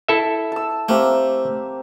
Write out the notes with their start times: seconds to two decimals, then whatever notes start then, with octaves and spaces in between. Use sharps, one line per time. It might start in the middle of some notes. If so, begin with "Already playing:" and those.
0.08 E4 A4 E5
0.52 A5 E6
0.89 A3 A#3 C4 G4